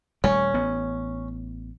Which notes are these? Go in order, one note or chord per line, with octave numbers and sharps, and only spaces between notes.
D#1 G3 A3 C#4
A1 B3